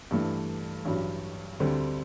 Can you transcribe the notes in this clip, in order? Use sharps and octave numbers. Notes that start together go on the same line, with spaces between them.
G2 E3 A3
A1 G2 F#3
D2 D3 G3 C4